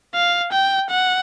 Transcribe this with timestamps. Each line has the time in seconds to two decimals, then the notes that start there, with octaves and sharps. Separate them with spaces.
0.15 F5
0.52 G5
0.91 F#5